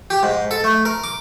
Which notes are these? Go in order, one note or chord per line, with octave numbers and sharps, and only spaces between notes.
G4
G#2
A4
A3
A#4
D6